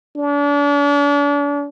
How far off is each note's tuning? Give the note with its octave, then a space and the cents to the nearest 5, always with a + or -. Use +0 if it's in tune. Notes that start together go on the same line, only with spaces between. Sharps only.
D4 -40